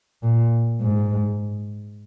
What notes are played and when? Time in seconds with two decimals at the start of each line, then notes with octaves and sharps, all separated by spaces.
0.23 A#2
0.81 G#2